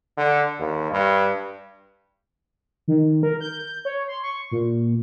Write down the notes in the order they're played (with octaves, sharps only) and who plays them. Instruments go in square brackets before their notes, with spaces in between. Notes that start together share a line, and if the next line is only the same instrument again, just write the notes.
[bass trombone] D3
D#2
G2
[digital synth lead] D#3
A#4
G6
C#5
C6
C#6
A#2